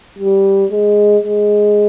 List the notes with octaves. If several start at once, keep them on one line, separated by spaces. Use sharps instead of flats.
G3
G#3
G#3